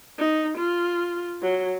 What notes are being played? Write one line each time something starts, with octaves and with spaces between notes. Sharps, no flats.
D#4
F4
F#3